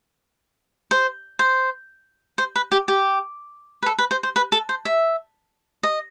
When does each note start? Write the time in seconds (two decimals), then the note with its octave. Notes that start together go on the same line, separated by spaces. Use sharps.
0.91 C5
1.39 C5
2.38 C5
2.56 B4
2.72 G4
2.88 G4
3.83 B4
3.86 A4
3.98 B4
4.11 C5
4.23 C5
4.36 B4
4.52 A4
4.69 C5
4.85 E5
5.83 D#5